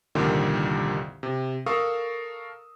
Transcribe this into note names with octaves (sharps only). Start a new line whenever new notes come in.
C2 F2 A#2 D3 D#3 G3
C3
A4 A#4 F5 C#6 D#6 E6